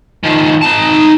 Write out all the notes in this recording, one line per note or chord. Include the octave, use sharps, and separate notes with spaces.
D#3 F3
D#4 A5